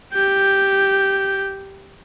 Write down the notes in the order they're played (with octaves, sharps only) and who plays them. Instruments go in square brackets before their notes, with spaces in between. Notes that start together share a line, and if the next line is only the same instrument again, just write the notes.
[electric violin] G4 G6